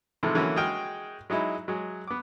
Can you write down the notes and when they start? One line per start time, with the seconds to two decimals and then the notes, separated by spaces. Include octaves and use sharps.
0.23 G#2 C3 E3 F3 A3
0.34 D3 E3 F#3 A#3 C#4 F#4
0.56 G#3 F#4 G#4 G5 G#5 F6
1.30 F#3 G#3 D#4 E4
1.68 F#3 G#3
2.07 B3 D6